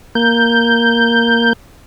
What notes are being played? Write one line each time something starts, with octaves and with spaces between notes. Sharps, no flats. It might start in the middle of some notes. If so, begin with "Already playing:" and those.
A#3 G6